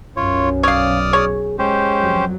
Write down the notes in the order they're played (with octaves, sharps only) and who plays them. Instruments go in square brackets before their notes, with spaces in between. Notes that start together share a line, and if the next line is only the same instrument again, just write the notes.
[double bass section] B1 F#2 [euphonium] C#4 [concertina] F4 C#5
[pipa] C#5 F5 [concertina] D5 D#6 F6
[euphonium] G#4 [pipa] C#5
[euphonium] G#3 [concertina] C#4 G4 C5
[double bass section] F2 F#3